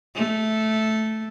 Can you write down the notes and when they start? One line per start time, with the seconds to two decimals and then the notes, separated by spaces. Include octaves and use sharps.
0.15 A3